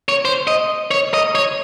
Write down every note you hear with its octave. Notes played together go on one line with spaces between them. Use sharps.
C#5
C5
D#5
C#5
D#5
C#5